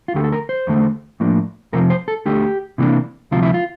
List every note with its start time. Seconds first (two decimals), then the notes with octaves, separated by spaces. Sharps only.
0.08 F4
0.14 D2 D3 A3 G4
0.24 A4
0.32 A#4
0.49 C5
0.67 E2 D3 A3
1.20 A2 F3 A#3 D4
1.73 F2 C3 F3 C4 A#4
1.90 C5
2.08 A4
2.26 D2 D3 A3 G4
2.78 C3 E3 G3 A#3 D4
3.31 D2 C3 F3 F4
3.43 E4
3.54 F4